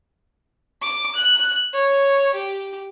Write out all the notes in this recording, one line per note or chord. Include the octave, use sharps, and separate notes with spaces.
D6
F#6
C#5
G4